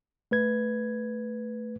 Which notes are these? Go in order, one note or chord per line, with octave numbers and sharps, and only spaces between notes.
A3 B4 G#6